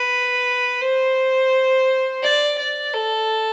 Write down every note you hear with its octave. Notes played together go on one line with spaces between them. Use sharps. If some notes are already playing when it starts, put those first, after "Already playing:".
Already playing: B4
C5
D5
D5
A4